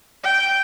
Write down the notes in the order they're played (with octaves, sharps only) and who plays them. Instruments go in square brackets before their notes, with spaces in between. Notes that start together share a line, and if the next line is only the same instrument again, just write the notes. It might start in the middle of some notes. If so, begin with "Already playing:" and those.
[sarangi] G5